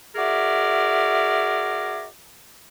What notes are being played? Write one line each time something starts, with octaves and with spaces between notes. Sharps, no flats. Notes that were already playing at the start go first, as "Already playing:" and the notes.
F#4 G#4 A#4 D5 E5